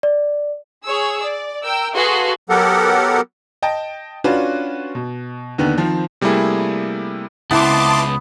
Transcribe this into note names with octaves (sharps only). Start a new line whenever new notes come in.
D5
G#4 C#5 E6
D5
A#4 G5 E6
F#4 G#4 A4 B4 F5 C6
F#3 B3 G4 A4 A#4 F#5
D#5 G5 A5
C#4 D4 F4 F#4 B4
B2
D#2 D3 D#3 B3
D#3 F3 C4
C3 G3 A3 A#3 E4 G#4
C#2 B3 C4 E4 A5 C6 D6